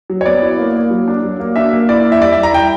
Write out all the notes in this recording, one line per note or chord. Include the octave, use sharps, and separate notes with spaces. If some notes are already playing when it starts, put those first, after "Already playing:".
F#3
C#5
B3 D5
E4
A#3
A#3
F#3
D4
F#3
A#3
D4 E5
A#3
E4 D5
E4
E5
G3 D5
E5
G3
A#5
E4 G5